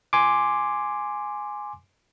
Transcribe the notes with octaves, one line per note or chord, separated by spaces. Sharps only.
G#5 C6 D6